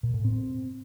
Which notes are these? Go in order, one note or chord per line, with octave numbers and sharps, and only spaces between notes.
A#2
A2
C4